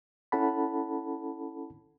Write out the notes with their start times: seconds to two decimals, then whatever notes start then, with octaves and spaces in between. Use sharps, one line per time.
0.32 C#4 E4 A4 F#5 A5 B5